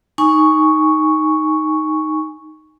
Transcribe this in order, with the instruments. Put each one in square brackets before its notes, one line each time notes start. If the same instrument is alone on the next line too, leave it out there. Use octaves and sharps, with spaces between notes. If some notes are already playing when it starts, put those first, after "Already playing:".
[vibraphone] D#4 G#5 C#6